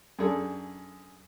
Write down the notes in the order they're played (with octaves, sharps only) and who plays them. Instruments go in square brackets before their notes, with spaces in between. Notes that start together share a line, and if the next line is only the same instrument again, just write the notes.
[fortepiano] F#2 D4 G#4 A4